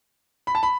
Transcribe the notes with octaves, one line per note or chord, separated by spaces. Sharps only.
B5
A5
B5